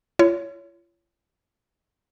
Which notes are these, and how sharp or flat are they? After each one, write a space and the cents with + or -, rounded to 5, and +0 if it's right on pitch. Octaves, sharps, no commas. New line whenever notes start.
F4 -40 C#5 +20